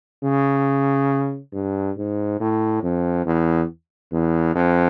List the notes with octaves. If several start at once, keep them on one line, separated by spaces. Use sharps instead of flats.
C#3
G2
G#2
A2
F2
E2
E2
F2